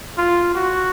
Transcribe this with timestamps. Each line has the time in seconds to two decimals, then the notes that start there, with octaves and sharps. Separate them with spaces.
0.18 F4
0.55 F#4